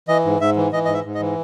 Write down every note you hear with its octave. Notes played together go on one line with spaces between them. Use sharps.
E3 D#5
G#2
G#2 E5
E3
E3 D#5
G#2 D#5
E5
G#2
D#5
E3